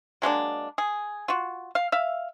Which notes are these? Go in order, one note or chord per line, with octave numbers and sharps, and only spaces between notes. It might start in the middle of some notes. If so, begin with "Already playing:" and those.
F#3 G#3 A#3 D4
G#4
F4 F#4
F5
E5 F5